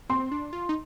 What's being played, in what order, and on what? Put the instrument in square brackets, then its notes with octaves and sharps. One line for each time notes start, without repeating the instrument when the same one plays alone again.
[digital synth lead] C4 [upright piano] C6
[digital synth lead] D4
F4
D#4